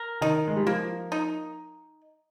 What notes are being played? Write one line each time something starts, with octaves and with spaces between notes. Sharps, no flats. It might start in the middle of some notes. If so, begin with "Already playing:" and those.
Already playing: A#4
D#3 D#4
G#3
G3
F3 A#3
D#4